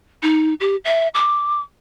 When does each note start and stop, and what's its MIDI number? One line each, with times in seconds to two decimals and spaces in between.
0.23 0.54 63
0.60 0.76 67
0.85 1.08 76
1.15 1.60 86